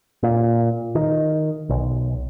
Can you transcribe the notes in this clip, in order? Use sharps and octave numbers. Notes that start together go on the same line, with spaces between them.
A#2
D#3
B1